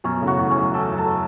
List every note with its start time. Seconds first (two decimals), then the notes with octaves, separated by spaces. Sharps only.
0.04 F#2 B2 C#4
0.21 A2 C#3
0.27 F#4
0.39 E2 A2
0.51 C#4
0.57 F#2
0.74 E2 A4
0.92 F#2
0.98 A4